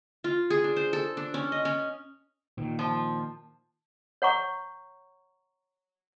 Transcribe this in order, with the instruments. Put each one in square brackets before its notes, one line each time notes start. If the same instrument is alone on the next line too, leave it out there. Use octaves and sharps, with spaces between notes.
[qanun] F4
G#4
D4
C5
A4
D4
C#4
D#5
C#4
[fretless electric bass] A#2 D#3
[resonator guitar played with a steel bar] F3
[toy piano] C#5 F#5 A#5 C#6